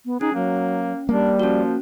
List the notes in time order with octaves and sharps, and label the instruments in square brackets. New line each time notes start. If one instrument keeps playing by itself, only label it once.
[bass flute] B3
[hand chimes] C#4 [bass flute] D#4 [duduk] G#4
[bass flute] F#3 [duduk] A#3
[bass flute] G3 [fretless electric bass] A#3 [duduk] D4
[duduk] F3 [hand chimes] C#4 F#4